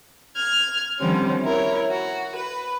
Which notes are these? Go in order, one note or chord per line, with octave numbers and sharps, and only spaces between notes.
F6 G#6
D3 D#3 F3 G3 C4 C#4
E4 A#4 C#5
F#4
B4